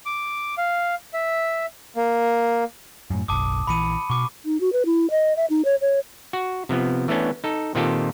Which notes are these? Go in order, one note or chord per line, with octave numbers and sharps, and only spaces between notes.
D6
F5
E5
A#3
F#2 A2
F#1 B1 A5 D6 D#6
A#1 E3 B5 C#7 D#7
B2 C#6 D6
D#4
F#4
B4
E4
D#5
E5
D#4
C#5
C#5
F#4
C3 F3 B3
E3 A3 B3 C#4 D4
D#4 A4
A#2 D#3 C4 F4 G4 A4